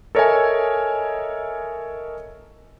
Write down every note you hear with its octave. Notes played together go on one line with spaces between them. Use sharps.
A4 A#4 C#5 D#5 E5 G#5